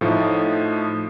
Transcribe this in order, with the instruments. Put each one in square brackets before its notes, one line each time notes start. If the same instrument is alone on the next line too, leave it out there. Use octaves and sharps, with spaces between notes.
[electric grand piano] A2 F3 A3 D#4